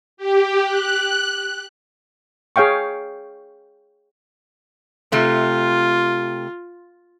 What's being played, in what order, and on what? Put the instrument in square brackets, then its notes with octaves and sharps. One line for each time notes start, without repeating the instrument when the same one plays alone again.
[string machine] G4
F#6
[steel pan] G#4 C#5 F5 G5 C#6
[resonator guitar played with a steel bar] C3 A3 [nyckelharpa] F4